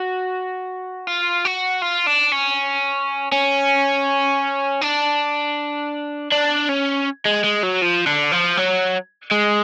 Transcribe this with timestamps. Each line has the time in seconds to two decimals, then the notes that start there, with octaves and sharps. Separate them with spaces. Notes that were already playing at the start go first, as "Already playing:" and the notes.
Already playing: F#4
1.07 F4
1.45 F#4
1.82 F4
2.07 D4
2.32 C#4
3.32 C#4
4.81 D4
6.32 D4
6.69 C#4
7.25 G#3
7.44 G#3
7.63 F#3
7.82 F3
8.07 D3
8.32 F3
8.57 F#3
9.32 G#3